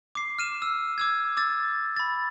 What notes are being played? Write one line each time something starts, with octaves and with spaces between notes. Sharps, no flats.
D6 C7
F6 D#7 E7
E6
D6 E6 G#6
D6 E6 A6
B5 A6